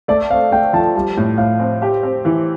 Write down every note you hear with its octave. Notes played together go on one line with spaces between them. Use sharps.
A3 D5
C4 F5
A3 G5
F3 A5
G3 A5
A2
A2 F5
C4
G4
C4
E3